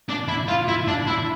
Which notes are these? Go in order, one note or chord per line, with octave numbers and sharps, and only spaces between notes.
D4
E4
F4
E4
D4
E4